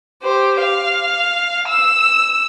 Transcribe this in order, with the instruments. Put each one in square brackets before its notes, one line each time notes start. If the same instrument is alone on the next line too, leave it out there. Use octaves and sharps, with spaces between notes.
[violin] G4 C5
F5
E6